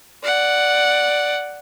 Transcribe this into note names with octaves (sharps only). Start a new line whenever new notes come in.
D5 F#5